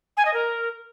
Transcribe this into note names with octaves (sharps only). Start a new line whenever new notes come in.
G#5
D#5
A#4